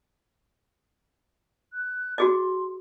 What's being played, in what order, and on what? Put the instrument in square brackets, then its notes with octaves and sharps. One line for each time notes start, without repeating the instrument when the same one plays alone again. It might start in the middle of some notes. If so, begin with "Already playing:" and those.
[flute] F#6
[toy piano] F#4 G#4 D#5 [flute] C6